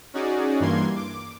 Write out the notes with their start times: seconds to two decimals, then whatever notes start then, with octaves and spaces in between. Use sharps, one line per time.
0.14 C#4 D#4 F#4 G#4 D5
0.60 G2 E3 A#3 C6 G#6
0.96 D6